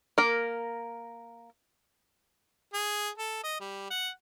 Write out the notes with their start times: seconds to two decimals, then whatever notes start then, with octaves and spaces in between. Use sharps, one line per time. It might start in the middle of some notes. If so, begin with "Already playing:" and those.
0.18 A#3 A#4
2.74 G#4
3.18 A4
3.44 D#5
3.60 G3
3.90 F#5